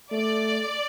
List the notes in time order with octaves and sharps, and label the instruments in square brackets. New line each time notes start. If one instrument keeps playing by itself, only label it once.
[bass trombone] A3 [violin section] D5